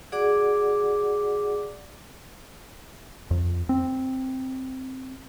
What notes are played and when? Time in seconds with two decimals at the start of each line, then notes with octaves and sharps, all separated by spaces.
0.12 F#4 G#4 D5 F#5 D6
3.31 F2
3.69 C4